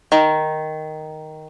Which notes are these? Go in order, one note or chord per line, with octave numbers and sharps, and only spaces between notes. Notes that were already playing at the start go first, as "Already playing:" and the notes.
D#3